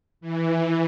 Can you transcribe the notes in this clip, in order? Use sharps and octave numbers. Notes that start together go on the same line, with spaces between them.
E3